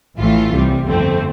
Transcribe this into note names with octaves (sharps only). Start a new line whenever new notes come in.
A1 A2 E3 A3 F4
C2 C3 G3
G1 F2 D3 A3 C4